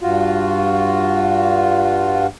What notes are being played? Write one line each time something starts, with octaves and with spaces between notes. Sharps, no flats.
G2 F4 F#4